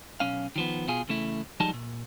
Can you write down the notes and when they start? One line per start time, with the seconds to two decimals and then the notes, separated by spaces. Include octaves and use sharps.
0.20 B1 C#4 F5
0.56 D#3 F3 B3
0.88 B2 F4 G#4
1.08 E2 C#3 A3 E4
1.60 F3 G3 G#3 D#4 A5
1.74 A#2